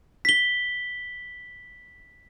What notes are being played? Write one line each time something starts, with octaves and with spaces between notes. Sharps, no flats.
B6 G7